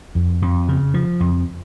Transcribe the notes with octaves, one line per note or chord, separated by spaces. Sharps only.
F2
F2
C#3
F3
F2